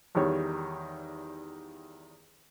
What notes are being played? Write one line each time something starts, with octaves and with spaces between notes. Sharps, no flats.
E2 D#3 G3 C#5